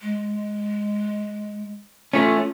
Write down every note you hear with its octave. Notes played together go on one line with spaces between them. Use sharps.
G#3
A3 C#4 F4